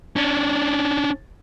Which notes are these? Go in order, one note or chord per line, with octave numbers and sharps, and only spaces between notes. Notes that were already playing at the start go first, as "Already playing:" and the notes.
C#4 D4